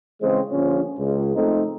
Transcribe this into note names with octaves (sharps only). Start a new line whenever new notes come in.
C#3 E3 G#3 C4
A#1 D3 F3 C#4
C#2
F2 A3 C4 D#4 A4